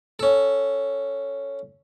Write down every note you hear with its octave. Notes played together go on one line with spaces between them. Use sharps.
C#4 A4